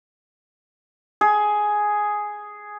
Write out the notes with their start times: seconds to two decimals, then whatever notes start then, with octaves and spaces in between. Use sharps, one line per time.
1.21 G#4